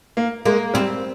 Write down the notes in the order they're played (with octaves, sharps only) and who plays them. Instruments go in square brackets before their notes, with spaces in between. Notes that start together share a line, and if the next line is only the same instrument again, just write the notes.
[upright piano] A#3
[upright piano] G#3 [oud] A#3
[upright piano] G3 [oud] C4